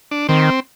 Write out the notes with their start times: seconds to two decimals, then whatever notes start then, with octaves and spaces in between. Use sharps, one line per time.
0.11 D4
0.29 D#3 C4